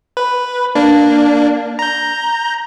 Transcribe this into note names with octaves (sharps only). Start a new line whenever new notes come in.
B4
A#3 D4
A#5 G6